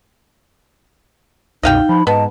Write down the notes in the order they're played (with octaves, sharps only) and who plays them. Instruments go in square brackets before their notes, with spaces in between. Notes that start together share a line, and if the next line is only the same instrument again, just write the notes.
[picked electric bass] C2 F#2 B2 [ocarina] D#4 [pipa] D#5 F5 G5
[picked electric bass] F3 [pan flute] B5
[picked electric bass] G#2 [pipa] B3 [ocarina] D#5 [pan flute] A5